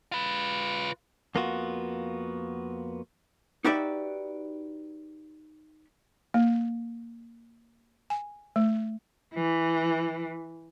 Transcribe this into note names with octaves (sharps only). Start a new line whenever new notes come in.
F4 B4
F2 A#3 B3 F4 F#4
D#4 F#4 G4 B4 D5 E5
A#3
G#5
A3
E3